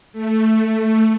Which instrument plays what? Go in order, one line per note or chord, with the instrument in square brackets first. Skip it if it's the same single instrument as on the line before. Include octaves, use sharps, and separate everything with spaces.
[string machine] A3